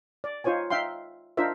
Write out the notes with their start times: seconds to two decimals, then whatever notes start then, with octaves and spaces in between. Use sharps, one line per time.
0.24 D5
0.44 D#4 F4 C5 C#5 G#5
0.70 D#4 E5 F5 G5 C6
1.37 D4 D#4 F4 A#4 C5 E5